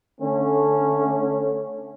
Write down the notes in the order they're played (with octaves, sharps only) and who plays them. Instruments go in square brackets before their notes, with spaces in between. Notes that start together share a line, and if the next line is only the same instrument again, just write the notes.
[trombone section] D3 A3 C#4